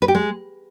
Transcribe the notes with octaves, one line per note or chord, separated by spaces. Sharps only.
B4
G4
G#3